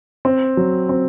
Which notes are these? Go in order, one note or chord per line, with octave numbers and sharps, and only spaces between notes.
C4
F#3
C4